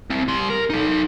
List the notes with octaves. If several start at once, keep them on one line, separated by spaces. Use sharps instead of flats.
C4 E4
G3 C6
A#4
D#4 A4